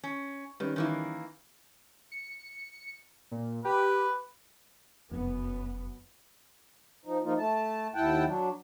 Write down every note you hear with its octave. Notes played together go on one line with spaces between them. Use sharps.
C#4
D#3 G3 C#4 B4
D#3 E3 A#3
C#7
A#2
G4 B4
F1 F#2 B3
F3 D#4
F3 A#3 D#4 F4
A3 A5
D#2 E4 F#5 G5 A5
F#3 D4